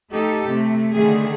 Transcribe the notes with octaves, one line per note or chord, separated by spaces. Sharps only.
A3 D#4 G4 A4
C3 A3
D3 D#3 A3 G#4